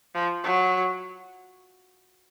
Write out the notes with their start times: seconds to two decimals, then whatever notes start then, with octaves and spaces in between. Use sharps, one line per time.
0.15 F3
0.44 F#3